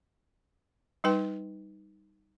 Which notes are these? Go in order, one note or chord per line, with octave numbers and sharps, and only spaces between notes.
G3 D#4 B4 G5